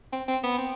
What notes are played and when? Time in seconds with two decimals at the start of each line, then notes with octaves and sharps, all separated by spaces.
0.13 C4
0.28 C4
0.44 B3
0.58 C4